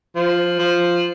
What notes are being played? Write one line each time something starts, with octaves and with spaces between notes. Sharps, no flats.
F3
F3